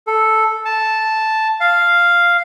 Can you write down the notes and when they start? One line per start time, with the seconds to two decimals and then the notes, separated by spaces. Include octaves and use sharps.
0.07 A4
0.65 A5
1.60 F5